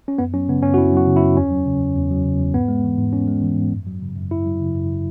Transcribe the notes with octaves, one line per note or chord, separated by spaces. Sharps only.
C#4
F#2 B3
F#3 C#4
C#3 B3
F#2 C#4
F#4
F#2 E4
F#3 F#4
C#3
E4
F#2
E2 C#4
F#3
C#3
E2
E2
F#3
C#3
E2
G#2 B3
G#3
E3
G#2
G#2 C#4
G#3
E3
G#2
F#2
F#3
C#3
F#2
F#2 E4
F#3
C#3
F#2